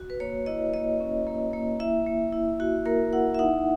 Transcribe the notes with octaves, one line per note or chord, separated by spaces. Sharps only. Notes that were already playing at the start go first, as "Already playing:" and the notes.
Already playing: F#4
B4
A#3 C#5
E4 D#5
A#3 D#5
C#4
A#3
A#3
E4 E5
A#3
E4
E4 F#4
A#3 A#4
E4 F#5
E5
D#4 F#5